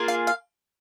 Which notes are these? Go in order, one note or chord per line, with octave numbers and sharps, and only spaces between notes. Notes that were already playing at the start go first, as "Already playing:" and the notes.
Already playing: A#3 F4 G#4
F5
F5